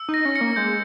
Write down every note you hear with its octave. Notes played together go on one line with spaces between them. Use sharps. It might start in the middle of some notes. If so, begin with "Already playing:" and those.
Already playing: E6
D#4
A#6
C#4
C#7
A#3
G#3 G6